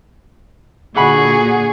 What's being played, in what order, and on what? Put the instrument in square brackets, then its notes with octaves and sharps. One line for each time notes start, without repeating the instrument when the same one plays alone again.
[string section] A#2 D3 F#4 [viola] G#4 [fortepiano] F#5 B5 [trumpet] C#6